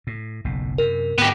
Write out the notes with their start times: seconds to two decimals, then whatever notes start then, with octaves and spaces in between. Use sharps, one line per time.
0.07 A2
0.44 F#1 B1 A2
0.78 F#2 C3 A#4
1.18 G#2 D3 B3 G4